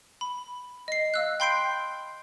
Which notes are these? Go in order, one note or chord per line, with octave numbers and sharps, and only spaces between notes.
B5
D#5 C7
F5 E6 F#6
G5 B5 C6 G6 C7 D7